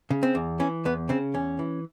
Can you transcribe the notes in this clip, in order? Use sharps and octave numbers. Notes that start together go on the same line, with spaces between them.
C#3
C4
E2
E3 C#4
E2 B3
C#3 C4
E2 C#4
E3